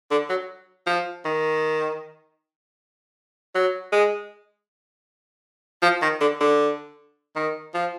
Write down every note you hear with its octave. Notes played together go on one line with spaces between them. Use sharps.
D3
F#3
F3
D#3
F#3
G#3
F3
D#3
D3
D3
D#3
F3